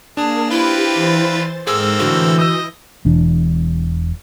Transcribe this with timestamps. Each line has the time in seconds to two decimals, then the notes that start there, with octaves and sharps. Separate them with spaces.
0.17 A#3 D4 G#4 A5
0.50 C4 E4 F4 G4 B4
0.95 E3 C5 A6
1.67 G#2 A#3 C4 G#4 A4 E6
1.99 A2 D3 E3 F#4 G6
2.39 D#5 D#6 E6
3.05 E1 E2 D4